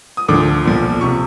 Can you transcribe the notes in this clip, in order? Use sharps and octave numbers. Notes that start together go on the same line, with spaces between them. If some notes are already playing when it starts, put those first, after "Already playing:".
D#6
D2 D3 F3 D6
B1 A#2 F3
C3 F3 C#6